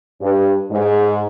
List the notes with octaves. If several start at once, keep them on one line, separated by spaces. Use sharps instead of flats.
G2
G#2